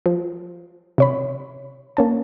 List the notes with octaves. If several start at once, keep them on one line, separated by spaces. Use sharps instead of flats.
F3
C3 C#5 B5
A#3 C#4 A5